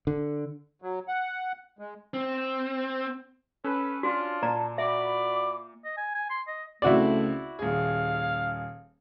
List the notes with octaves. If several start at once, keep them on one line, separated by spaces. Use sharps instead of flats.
D3
F#3
F#5
G#3
C4
C#4 A4 B4
D4 F4 F#4
A#2 D5 A5 A#5
F#4 D5 E5 B5 D6
D#5
G#5
G#5
C6
D#5
C#2 A3 C4 E4 F#4 D5
D#1 G#4 F5